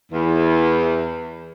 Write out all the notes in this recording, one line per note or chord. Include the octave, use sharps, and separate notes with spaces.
E2